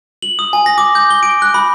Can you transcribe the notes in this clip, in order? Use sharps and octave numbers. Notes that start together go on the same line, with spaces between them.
F#7
D#6
G#5
A#6
D6
G6
G7
D7
F#6
B5